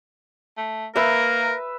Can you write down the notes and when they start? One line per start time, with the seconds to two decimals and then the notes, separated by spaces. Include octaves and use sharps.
0.58 A3
0.96 A#3 A#4 B4 E5